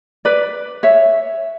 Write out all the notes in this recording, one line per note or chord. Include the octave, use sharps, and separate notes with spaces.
B4 D5
C#5 E5